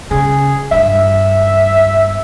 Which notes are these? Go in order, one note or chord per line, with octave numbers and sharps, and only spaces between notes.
C#3 G#4
G2 E5